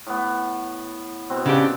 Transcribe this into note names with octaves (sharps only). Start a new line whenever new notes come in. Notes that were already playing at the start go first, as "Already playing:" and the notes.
A2 B3
B2 B3 C4
C#3 D4 G4